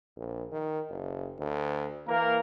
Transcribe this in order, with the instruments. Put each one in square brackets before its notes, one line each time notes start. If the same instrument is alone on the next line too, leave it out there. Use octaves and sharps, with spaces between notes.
[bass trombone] A#1
D#3
F#1
D2
[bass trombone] E3 [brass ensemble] A#3 A#4